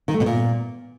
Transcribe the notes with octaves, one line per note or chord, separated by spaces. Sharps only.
D#3
A3
B2
A#2